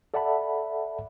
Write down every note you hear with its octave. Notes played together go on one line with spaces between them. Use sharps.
A4 D5 E5 F#5 A5 B5